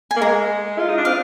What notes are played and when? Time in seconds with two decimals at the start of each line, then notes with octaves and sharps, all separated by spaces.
0.11 G#5
0.16 A#3
0.21 G#3 A#5
0.79 F4
0.89 D#4
0.98 D4
1.05 C4 F5